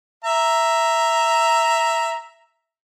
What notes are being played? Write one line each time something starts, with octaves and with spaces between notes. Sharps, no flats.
E5 A#5